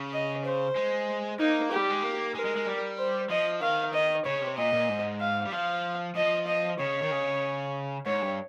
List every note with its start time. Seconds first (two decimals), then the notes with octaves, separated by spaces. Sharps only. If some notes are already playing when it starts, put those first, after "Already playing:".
Already playing: C#3
0.13 D#5
0.45 C5
0.76 G#3
1.39 A#3 D#4
1.71 G3 G4
1.90 G#3
2.02 A#3
2.35 G#3 A#4
2.45 G#3
2.56 G#3
2.67 G3
2.98 C5
3.30 F3 D#5
3.61 D#3 F5
3.93 D#5
4.25 C#3 C#5
4.41 C3
4.57 A#2 D#5
4.73 A#2
4.89 G#2
5.20 F5
5.45 G3
5.52 F3 F5
6.16 F3 D#5
6.47 D#5
6.79 C#3 C#5
7.02 D#3
7.11 C#3
8.06 G#2 C#5
8.22 G2